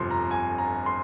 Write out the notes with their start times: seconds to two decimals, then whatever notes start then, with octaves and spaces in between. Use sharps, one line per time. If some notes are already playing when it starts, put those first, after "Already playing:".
Already playing: G1 F2 C3 F3 C6
0.11 A#5
0.31 G#5
0.58 A#5
0.86 C6